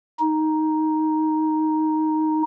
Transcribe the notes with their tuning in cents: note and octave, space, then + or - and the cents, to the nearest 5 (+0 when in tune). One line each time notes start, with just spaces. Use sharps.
D#4 +5